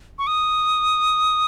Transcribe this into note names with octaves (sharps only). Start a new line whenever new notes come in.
C#6
D#6